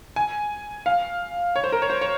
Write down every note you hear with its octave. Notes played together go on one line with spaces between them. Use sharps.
G#5
F5
C#5
C5
A#4
C#5
C5
C#5